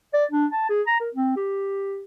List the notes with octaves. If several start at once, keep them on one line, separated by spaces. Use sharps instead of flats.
D5
D4
A5
G#4
A#5
A#4
C4
G4